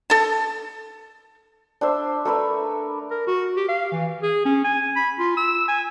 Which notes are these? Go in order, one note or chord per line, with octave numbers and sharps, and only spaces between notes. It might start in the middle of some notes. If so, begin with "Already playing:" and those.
A4 A5
D4 C5 E5
A3 A#4 B4 E5
A#4
F#4
G4
F5
E3
G#4
C#4
G#5
B5
F4
E6
G#5